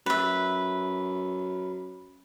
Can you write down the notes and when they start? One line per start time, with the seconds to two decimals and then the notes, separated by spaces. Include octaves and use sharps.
0.06 F#2 B4 E5